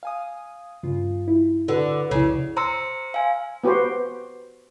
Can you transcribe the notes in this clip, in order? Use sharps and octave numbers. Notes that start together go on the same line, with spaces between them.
F5 G#5 D#6
G2 C#3 F4
E4
D3 F#4 B4 F#5
C2 F2 C#3 E4
C5 A#5 C6 E6 C#7
F5 G#5
B3 F#4 G4 B4 C5